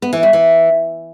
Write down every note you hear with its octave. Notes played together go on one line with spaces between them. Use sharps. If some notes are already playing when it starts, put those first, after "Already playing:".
B3
E3
G3
E3